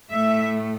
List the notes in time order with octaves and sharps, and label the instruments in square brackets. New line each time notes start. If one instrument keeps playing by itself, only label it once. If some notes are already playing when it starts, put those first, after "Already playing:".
[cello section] A2 A3 E5